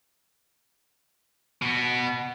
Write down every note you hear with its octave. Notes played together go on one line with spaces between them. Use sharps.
B2 B3